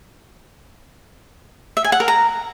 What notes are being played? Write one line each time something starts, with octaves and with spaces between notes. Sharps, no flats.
E5
G#5
F#5
A#4
A#5